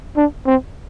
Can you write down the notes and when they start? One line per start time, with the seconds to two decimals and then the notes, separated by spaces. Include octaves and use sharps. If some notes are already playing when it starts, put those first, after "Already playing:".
0.17 D4
0.46 C4